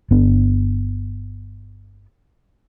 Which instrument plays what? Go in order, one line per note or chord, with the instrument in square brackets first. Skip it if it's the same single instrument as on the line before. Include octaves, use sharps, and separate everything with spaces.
[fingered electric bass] G1 B3 D4